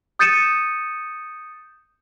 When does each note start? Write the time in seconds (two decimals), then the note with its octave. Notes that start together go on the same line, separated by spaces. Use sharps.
0.19 D#6 G6 A6 C#7 D#7 E7